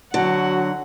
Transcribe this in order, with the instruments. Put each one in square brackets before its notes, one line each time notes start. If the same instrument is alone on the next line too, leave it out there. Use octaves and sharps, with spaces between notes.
[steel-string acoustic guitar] D3 [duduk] F#3 [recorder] F#4 [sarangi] F#5